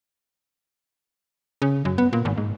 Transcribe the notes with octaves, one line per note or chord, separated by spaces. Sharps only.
C#3
F#2
B3
A#2
G#1
G#2